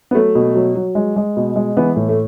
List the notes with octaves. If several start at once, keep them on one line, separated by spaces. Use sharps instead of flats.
B3
F#3 A3
B2
F#3
F#3
G#3
G#3
B2
G#3
E3 B3
A2
A3